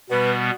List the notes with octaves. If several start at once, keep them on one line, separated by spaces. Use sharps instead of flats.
B2 G3 B3 B4